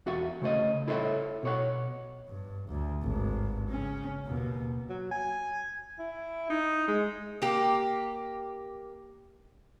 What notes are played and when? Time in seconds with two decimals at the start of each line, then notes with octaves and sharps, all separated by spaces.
0.06 E2 F#4 E5 F#5
0.42 C#3 A3 C5 D#5
0.88 E4 A4 C5 C#5 D#5 E5
1.43 B2 C#5 F#5
2.28 G2
2.68 D2
3.02 G#1 G2
3.69 C#3 C#4
4.26 D#2 B2
4.90 F#3
5.11 G#5
5.99 E4
6.50 D#4
6.88 G#3
7.42 A#3 G4